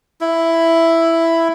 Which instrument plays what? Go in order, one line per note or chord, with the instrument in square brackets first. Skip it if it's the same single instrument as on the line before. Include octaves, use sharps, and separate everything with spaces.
[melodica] E4